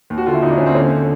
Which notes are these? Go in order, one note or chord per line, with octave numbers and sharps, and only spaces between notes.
D#2
F#4
D3 F4
E4
D3 D#4
D4
D#2 C#4
C4
D3 C#4